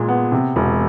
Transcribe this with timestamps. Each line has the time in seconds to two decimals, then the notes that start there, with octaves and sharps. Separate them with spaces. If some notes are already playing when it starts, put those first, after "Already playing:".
Already playing: A#2 G#3
0.08 B3
0.32 C3
0.56 E1